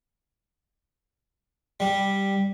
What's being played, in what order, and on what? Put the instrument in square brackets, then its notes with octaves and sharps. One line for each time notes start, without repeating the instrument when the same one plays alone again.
[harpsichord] G3